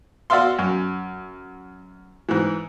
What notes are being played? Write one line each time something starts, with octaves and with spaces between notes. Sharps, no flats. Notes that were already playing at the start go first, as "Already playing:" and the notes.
F#4 D5 E5 F5 C6
F#2
G#2 E3